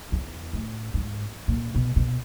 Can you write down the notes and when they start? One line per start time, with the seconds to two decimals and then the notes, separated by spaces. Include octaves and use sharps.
0.12 E2
0.53 A2
0.94 G#2
1.48 A#2
1.75 B2
1.96 B2